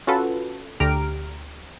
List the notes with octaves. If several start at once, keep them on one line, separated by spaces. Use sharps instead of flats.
C#4 F4 F#4 A4 B4
D2 D3 G4 A#5 F6 D7